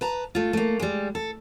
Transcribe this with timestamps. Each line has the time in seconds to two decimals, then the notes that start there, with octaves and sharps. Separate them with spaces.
0.01 B4 A5 A#5
0.35 A3 F4
0.53 A3 A#3
0.80 G3 G#3
1.15 A4